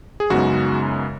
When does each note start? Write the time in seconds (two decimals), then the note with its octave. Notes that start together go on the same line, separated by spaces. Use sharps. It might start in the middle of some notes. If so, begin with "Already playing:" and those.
0.20 G#4
0.30 F#2 C#3 G#3 B3 D#4 F#4